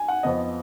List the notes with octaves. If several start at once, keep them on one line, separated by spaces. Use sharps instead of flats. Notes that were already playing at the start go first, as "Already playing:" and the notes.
Already playing: G#5
F#5
F2 F3 B3 D#5